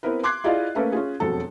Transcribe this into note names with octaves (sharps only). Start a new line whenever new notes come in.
B3 C4 E4 A#4 B4
C6 D6 F#6 G#6 C7
E4 F4 G#4 D5 D#5 F5
A3 A#3 C#4 A4 B4 E5
C#4 F4 G#4
E1 F2 F#3 A4